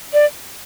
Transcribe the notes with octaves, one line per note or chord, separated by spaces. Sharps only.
D5